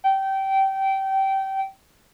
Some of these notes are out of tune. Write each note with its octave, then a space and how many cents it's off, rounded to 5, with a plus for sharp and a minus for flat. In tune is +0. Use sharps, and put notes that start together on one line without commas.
G5 -20